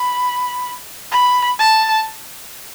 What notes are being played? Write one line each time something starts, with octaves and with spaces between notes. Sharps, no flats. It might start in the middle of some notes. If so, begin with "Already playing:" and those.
Already playing: B5
B5
A5